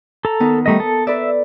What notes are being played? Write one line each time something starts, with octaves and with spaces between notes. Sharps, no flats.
A4 A#5
D#3 B3 D#4
G3 A3 D#5 E5 A#5 D#6
A4
A4 B4 D5 E5